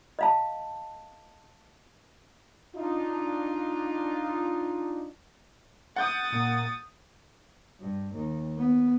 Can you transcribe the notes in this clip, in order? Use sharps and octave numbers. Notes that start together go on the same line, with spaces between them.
D#5 F5 A5
D4 D#4 F4
F#5 D#6 G6 A6
A#2
G2
D#2
B3